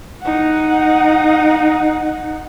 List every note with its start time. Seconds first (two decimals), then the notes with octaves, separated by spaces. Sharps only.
0.23 D#4 F#5